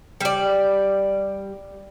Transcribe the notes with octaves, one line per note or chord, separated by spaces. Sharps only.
G3 D5